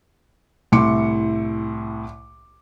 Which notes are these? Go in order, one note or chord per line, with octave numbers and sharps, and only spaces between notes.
C2 A2 E4 C6 D6 C#7